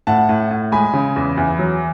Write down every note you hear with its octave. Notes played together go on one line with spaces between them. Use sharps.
A2 F#5 A5
A2
A2
G#3 G#5 B5
C#3
E2
E2
F#3